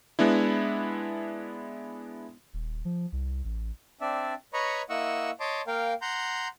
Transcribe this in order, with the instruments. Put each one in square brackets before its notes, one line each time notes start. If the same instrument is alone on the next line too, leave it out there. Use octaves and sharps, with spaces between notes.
[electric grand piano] G#3 B3 D4 E4
[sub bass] D#1
F3
C2
A1
[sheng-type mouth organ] C4 D4 D5 E5
B4 C#5 D#5 A#5 B5 C#6
A#3 E4 D#5 F#5 C#6 E6
C#5 D#5 A5 C6 D6
A#3 A#4 F5 G5
F#5 A#5 C6 G6